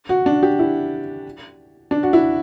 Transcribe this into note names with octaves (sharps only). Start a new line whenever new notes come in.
F#4
D4
G4
E4
D4
F#4
E4